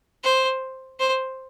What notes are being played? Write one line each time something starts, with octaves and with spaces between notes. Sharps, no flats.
C5
C5